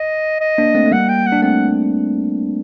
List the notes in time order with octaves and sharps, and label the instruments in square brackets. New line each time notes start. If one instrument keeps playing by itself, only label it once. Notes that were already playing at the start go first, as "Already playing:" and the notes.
Already playing: [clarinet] D#5
D#5
[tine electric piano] A#3 D4
A3 C4
A3
[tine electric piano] G3 A#3 [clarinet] F#5
[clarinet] G5
F#5
[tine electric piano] D4
[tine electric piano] A3 C4 [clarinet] F#5